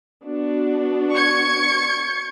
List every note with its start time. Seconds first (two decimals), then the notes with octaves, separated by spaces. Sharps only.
0.24 B3 D4 F#4
1.14 C#6 G#6 C#7